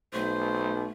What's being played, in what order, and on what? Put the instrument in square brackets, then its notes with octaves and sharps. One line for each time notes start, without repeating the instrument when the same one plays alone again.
[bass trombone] B1 [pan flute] A3 [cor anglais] C5